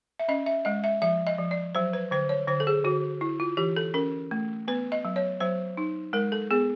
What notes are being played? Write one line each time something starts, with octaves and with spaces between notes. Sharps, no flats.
E5
C#4 D#5
E5
G#3 D#5
E5
F3 E5
D#5
F3
D5
F#3 C5
B4
D3 C5
C#5
D3 C5
A4
G#4
D3 F#4
E4
F4
E3 G4
A4
C#4 A#4
A3
B3 B4
D#5
F#3
C#5
F#3 C5
D#4
G#3 A#4
A4
B3 G#4